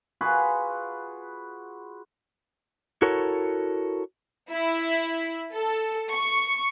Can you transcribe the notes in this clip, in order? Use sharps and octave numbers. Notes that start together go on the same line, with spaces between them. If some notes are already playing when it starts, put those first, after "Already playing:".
F4 F#4 G#4 B4
E4 F#4 A4 A#4 C#5
E4
A4
C#6